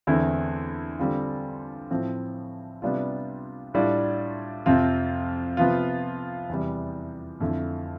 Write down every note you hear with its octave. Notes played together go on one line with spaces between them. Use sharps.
E2 D3 A3 C4 E4
D3 G3 C4 F4
A2 F3 C4
C3 G3 B3 D4 F4
A2 G3 D4 F4
F2 C3 F3 C4 F4
C3 F3 B3 F4
E2 C3 G3
F2 D3 A3 E4